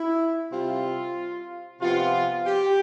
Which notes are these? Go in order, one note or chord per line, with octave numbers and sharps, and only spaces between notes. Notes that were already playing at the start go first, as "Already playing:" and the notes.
Already playing: E4
C3 G3 C4 F4
C3 F3 B3 F4
G4